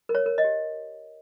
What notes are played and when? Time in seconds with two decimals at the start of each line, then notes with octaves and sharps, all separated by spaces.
0.09 A#4
0.15 C#5
0.26 A#4
0.38 D#5
0.44 G4